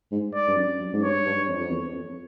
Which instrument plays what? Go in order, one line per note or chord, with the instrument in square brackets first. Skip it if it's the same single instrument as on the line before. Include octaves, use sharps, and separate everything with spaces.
[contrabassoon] G#2
[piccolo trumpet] D5
[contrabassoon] G2
F#2
F#2
G#2
[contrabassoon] G2 [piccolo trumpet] C#5
[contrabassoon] G2
F2
F2
E2
F2